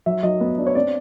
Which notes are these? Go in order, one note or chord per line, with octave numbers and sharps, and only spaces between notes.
F#3 E5
F#3 D#5
B3
D4
C#5
C4 D5